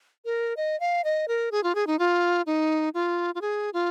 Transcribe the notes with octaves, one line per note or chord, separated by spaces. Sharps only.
A#4
D#5
F5
D#5
A#4
G#4
F4
G#4
D#4
F4
D#4
F4
F4
G#4
F4